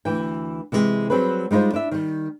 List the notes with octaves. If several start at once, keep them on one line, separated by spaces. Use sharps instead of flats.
D2 E3 G5
C3 E3 G#3 G4
F#3 G3 C4 G#4 B4
G3 G#3 D#4 F4 C5
D4 E4 E5
D#3 G3